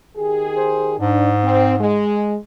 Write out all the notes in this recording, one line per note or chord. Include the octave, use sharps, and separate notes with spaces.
D#3 G4 G#4
C5
G#2 D4
C4
G#3